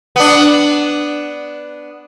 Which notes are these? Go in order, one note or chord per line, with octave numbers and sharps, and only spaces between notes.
B3 D4